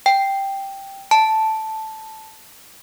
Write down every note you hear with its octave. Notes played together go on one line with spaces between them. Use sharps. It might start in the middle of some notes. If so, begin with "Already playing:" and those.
G5
A5